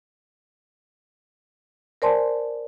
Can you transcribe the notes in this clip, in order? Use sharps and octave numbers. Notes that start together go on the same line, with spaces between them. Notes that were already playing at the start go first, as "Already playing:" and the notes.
A#4 C5 D5 G#5 A5 C6